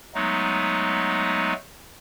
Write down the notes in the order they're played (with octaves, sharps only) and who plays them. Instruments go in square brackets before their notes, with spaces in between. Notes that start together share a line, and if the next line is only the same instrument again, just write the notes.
[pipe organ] F#3 G#3 A3 B3 D#4